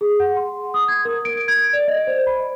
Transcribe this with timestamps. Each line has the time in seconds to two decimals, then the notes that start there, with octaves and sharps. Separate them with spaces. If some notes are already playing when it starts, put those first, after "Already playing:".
0.01 G#4
0.20 F#5
0.36 C6
0.74 D#6
0.88 G#6
1.05 A#4
1.25 D7
1.48 G#6
1.73 D5
1.88 D#5
2.07 C5
2.27 B5